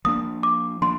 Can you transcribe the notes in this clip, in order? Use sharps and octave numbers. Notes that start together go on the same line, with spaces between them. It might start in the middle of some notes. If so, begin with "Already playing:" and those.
F3 A#3 D4 D#6
D6
F3 A#3 D4 C6